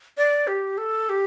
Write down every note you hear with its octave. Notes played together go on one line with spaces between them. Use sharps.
D5
G4
A4
G4